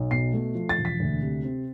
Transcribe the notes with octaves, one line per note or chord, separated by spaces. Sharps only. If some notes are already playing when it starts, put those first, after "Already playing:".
Already playing: B1
B2 C7
A3
F3
A6
E1
B6
D2
C3
C4